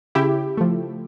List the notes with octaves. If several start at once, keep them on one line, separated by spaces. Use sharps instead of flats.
C#3 E4 G4
F3 A3